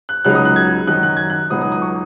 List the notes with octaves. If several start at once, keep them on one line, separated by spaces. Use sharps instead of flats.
F#6
C#2 C#3 F#3 D#4 F#6
D#6
F#6
G#6
F#2 D#3 F#3 D#4 F#6
F#6
G#6
F#6
C#2 B2 F#3 D#4 D#6
D#6
D#6
C#6